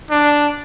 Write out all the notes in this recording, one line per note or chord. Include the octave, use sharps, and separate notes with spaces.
D4